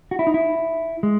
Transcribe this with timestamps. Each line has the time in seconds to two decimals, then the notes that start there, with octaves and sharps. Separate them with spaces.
0.11 F#4
0.19 E4
0.27 D#4
0.34 E4
1.03 G#3